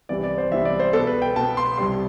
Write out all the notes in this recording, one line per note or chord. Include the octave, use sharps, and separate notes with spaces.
C2 C3 E3 B3 D5
D5
C5
C2 C3 E3 B3 E5
D5
C5
B2 B3 A4
B4
G5
B2 B3 A5
C6
C2 C3 G3 C6